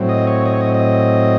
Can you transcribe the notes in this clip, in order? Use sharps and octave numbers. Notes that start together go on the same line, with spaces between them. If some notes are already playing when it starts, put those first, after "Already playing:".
Already playing: A2 F#3 C4
D#5
C#5
D#5
C#5
D#5
D#5